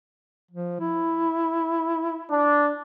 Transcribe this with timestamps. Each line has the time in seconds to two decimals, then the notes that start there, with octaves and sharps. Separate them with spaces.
0.51 F3
0.80 E4
2.31 D4